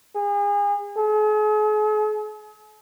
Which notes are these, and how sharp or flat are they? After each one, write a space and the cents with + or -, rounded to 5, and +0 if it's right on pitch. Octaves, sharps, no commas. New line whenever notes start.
G#4 -35
G#4 +45